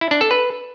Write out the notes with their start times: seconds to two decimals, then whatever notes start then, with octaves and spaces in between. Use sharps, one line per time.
0.01 E4
0.11 D4
0.21 A4
0.31 B4